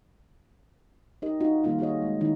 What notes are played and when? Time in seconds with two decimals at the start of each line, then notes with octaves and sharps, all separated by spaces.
1.22 D#4 G4 A#4 D#5
1.40 D#4 F4 F#4
1.63 D#3 G3 A#3 D#4 F4 F#4
1.79 F4 F#4 G#4 C#5 D#5
2.02 G#3
2.21 D#3 E3 D#4 E4